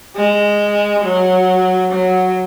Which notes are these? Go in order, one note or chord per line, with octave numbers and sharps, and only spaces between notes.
G#3
F#3
F#3